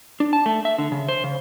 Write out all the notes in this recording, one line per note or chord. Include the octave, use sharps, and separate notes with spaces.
D4
A5
A3
E5
D3
C#3
C5
C#3